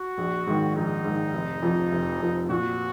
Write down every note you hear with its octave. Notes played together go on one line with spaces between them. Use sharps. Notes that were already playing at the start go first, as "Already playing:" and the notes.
Already playing: F#4
A#1
G#2 D#3
A#1 D#4
G#2 D#3
F1
F2 F3
F1
F2 F3
A#2 F#4